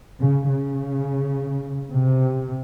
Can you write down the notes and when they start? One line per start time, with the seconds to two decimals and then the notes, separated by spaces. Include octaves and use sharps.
0.20 C#3
0.49 C#3
1.92 C3